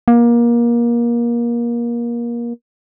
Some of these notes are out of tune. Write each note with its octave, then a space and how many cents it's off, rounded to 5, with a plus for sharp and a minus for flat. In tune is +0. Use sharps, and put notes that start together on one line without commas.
A#3 +25